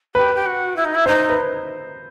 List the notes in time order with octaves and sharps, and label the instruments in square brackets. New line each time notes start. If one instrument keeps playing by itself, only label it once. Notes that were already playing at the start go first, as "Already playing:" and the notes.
[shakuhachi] G4 [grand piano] B4
[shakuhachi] G4
F#4
E4
D#4
E4
[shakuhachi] D#4 [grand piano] C5
[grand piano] B4